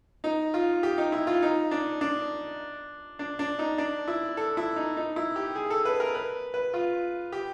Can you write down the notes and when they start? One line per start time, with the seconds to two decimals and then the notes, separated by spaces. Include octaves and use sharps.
0.24 D#4
0.54 F4
0.83 G4
0.98 D#4
1.12 E4
1.27 F4
1.42 D#4
1.71 D4
2.01 D4
3.19 D4
3.39 D4
3.59 D#4
3.78 D4
4.08 E4
4.37 A4
4.57 E4
4.76 D#4
4.97 D#4
5.16 E4
5.36 G4
5.55 G#4
5.70 A4
5.85 B4
6.00 A#4
6.15 B4
6.54 B4
6.74 F4
7.32 G4